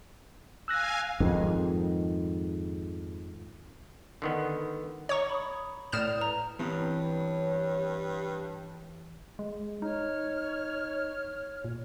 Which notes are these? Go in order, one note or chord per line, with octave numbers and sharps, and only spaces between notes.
F5 G#5 E6 F#6 A#6
F2 G#2 D#3
D3 D#3 B3
C#5 A#5 C#6 D6
B5 D#6
A2 D5 D#6 F6 G6 E7
B4 A#5
G2 E3 B3 C4 C#5
G#3
D#4 C#5 F6
A#2